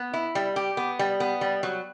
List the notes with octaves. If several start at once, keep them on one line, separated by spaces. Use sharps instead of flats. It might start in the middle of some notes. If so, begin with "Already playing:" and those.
Already playing: B3
E4
G3
G4
B3
G3
B3
G3
F#3